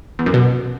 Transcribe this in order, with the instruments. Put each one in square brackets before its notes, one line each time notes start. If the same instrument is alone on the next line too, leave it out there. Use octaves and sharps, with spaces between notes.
[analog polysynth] E2
F#2
B2